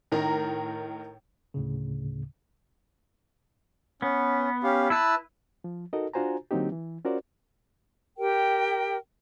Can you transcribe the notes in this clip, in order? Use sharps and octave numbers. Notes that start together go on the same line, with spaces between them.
A2 D#3 A#4 A#5
D2 A2 C#3
B3 C#4
C#4 G4 F5
E4 B4 A5 E6
F3
D#4 F#4 A4 A#4 D#5
D4 F4 F#4 C5 G#5 A#5
D3 F#3 A#3 C4 D#4 G4
E3
C#4 F4 F#4 A#4 C5 D5
G4 A#4 G5